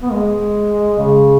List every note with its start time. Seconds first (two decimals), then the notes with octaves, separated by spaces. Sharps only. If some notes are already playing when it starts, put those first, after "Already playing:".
0.02 B3
0.12 G#3
0.98 C#3